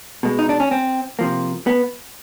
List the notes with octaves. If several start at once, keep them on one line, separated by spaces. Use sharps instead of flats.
B2 G#3
D#4
D4
C#4
C4
C3 F3 A#3
B3